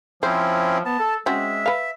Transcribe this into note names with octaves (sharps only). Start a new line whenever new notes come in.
F3 C4 C#4 E4 C5
B3 A5
A4
G#3 C4 C#4 F#4 E5
B4 F5